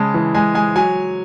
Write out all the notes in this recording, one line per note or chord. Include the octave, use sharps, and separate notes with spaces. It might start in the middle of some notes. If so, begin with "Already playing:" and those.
Already playing: C#3 G#3 A5
E3
G#3 G#5
G#3 G#5
F#3 G#5